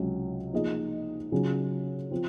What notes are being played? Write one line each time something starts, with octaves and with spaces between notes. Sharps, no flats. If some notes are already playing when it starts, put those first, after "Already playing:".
Already playing: C#2 C3 F#3 C#4
F3 A#3 D#4 G#4 D#5
C#3 F#3 C#4 F4 G#4
F3 C4 F4